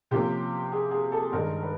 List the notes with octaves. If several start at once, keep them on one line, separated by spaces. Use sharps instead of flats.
C3 F3 A#3 C#4 G4
G#4
G#4
A4
G2 D#3 G#3 A#4
B4